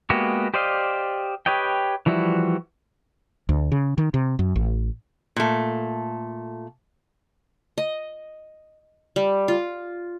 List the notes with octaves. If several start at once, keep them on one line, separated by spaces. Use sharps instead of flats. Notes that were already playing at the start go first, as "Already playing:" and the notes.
G#3 A#3 B3 F#4 G4
G4 C5 D5 D#5 F5
G4 B4 C#5 D#5 G5
E3 F3 G3 E4 F#4
D2
C#3
D#3
C3
F#2
A1
A#2 A3
D#5
G3
F4